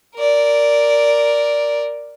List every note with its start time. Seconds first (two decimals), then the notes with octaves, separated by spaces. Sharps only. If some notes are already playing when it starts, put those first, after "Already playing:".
0.16 A#4 D5